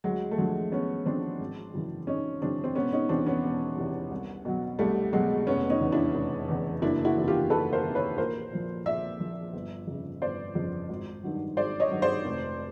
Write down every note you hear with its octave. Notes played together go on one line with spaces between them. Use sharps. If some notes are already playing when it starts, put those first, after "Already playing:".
D2 F#3 G#3
A3
D3 F3 F#3 G#3
D2 B3 C#4
D3 F3 C4 D4
G#1
F#2 C#3 E3
G#1 C#4 D#4
F#2 C#3 E3 C4 D4
C4
E1 B3 C#4
C#4 D#4
E2 C3 E3 C4 D4
B3 C#4
E1
E2 C3 E3
C2
B2 F#3
C2 G3 A3
B2 F#3 G#3
F1 B3 C#4
C#4 D#4
E2 C#3
D4 E4
F1
E2 C#3
F#1 D4 E4
E4 F#4
E2 C3 D#3
F4 G4
F#1 A4 B4
A#4 C5
E2 C3 D#3
B4 C#5
A#1 A#4 C5
A#2 F3
A#1 D5 E5
A#2 F3
G1
F2 C#3
G1 C5 D5
F2 C#3
G#1
G2 D#3 F#3
G#1 C5 D5
C#5 D#5
G2 D#3 F#3
C5 D5
F1